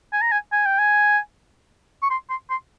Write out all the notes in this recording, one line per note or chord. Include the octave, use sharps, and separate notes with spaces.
G#5
A#5
G#5
G#5
G5
G#5
C#6
C6
C6
C6